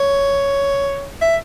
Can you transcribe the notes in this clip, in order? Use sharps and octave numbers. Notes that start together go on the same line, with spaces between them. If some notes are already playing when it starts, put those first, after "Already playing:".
Already playing: C#5
E5